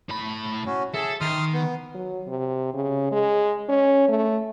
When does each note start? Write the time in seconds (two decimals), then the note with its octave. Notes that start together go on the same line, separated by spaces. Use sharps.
0.09 A2 B5
0.66 C#4 F#4
0.94 G#4 A4 E5
1.21 D#3 C6 D#6 F6
1.54 B3
1.94 F#3
2.27 C3
2.74 C#3
3.12 G#3
3.69 C#4
4.08 A3